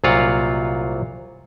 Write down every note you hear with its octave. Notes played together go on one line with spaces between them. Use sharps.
C2 A#2 F#3 F4 F5 F#5